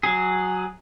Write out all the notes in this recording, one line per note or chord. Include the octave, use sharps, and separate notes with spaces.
F#3 G#4